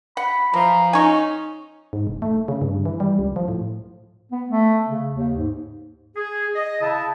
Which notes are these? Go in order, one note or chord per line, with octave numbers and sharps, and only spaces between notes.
F#5 B5
E3 F3 A#5
C#4 D#4 G#5 A#5 C#6
G#2
E1
A3
C#3
G2
E3
G3
C#2
F3
A2
B3
A3
C#3
D#2
G#2
G#4
D#5
C#3 E4 A5